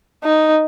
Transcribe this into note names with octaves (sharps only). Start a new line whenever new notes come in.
D#4